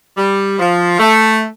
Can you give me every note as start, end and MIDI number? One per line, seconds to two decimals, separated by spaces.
0.17 0.56 55
0.59 0.95 53
0.99 1.45 57